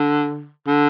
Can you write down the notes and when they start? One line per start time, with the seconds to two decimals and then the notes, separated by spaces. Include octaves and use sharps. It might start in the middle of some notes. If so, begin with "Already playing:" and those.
Already playing: D3
0.67 D3